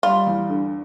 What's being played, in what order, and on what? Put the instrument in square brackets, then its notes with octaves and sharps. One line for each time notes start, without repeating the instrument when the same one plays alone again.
[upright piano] G3 [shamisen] F4
[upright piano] E2
D3